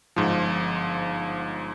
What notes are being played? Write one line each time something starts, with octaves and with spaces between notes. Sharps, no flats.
G1 G#2 F3